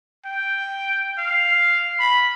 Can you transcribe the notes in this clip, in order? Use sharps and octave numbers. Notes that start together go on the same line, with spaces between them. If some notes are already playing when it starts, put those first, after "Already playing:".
G5
F5
B5